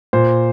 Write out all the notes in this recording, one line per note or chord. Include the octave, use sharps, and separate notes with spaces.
A#2 C5